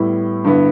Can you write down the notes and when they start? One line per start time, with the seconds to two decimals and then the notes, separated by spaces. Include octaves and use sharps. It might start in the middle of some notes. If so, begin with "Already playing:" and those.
Already playing: A2 G3 B3 E4
0.45 G2 D3 B3 E4